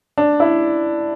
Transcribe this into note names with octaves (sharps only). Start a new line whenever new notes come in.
D4
E4